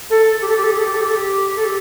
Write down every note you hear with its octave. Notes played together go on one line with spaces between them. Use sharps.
A4
G4
A4
G4
A4
G4
A4
G4
A4
G4
A4
G4
A4
G4